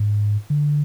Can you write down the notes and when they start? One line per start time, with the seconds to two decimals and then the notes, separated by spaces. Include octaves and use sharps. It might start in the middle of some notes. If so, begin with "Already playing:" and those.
Already playing: G#2
0.50 D3